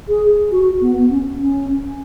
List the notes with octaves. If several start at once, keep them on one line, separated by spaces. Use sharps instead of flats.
G#4
F#4
B3
C#4
C#4